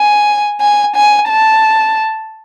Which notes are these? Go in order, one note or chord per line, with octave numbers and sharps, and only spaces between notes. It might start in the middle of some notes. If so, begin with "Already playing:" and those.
Already playing: G#5
G#5
G#5
A5